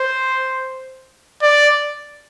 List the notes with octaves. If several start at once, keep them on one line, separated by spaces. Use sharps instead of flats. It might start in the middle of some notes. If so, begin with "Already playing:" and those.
Already playing: C5
D5